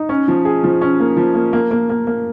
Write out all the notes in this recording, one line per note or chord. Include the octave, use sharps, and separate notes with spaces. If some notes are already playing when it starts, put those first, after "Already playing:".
Already playing: D#4
C#4
F3
G#4
F3
C#4
A#3
F3
A#3
A#3
A#3
A#3
A#3